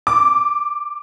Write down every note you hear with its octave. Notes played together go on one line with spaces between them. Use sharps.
D6